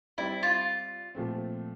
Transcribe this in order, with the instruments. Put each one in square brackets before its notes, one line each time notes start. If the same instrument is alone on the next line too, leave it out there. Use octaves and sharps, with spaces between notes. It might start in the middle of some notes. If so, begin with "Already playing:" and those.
[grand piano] G3 C4 G4 D5 [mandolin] E4
[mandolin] F4
[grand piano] A#2 F3 A3 C4